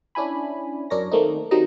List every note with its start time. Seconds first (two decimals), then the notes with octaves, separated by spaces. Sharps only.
0.15 C#4 D4 E4 G#5 B5
0.90 F#2 D4 A#4 C#5 A#6
1.11 D#3 A3 A#3 C4 D#4
1.51 D#3 F#3 G3 C4 D#4 D#5